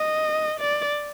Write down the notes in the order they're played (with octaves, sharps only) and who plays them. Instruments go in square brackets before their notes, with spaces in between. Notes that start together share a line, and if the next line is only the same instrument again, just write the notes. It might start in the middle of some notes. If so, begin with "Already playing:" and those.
Already playing: [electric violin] D#5
D5